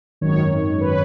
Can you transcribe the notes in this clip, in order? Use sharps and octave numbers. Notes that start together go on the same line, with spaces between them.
G#1 F#2 D#3 C#5
B4